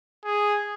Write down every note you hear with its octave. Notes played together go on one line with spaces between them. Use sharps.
G#4